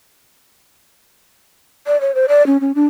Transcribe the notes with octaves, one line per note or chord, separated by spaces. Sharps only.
D5
C#5
C5
D5
C#4
C#4
D4